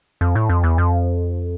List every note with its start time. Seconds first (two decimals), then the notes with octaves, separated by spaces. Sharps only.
0.21 F2
0.35 A2
0.49 F2
0.63 E2
0.78 F2